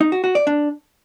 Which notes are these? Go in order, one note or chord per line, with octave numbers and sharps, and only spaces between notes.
D#4
F#4
F#4
D5
D4